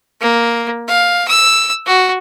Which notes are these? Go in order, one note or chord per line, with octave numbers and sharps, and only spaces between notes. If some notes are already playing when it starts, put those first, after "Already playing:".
A#3
F5
E6
F#4